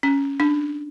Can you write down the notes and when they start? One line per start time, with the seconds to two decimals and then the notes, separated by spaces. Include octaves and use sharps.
0.03 C#4
0.40 D4